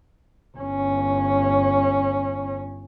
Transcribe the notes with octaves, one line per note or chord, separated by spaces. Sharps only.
G1 C#4